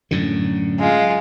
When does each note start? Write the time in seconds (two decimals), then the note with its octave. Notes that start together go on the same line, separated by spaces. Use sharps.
0.11 F#2 A2 D3
0.79 G#3 F4